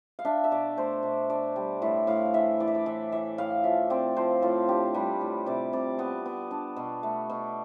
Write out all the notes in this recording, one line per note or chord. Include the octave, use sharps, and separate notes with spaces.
F5
D4 E5
E5
B2 D5
A3 C5
B2
D4 D5
G3
A2 E5
A2 F5
E3 E5
E3 D5
E5
D5
E3 E5
E3 E5
A2 F5
F3 E5
C4 D5
F3 C5
A2 F4
D4 G4
G3 B4
A2
C3 D5
C3 D5
B3 D5
B3
D4
B2
A3
B2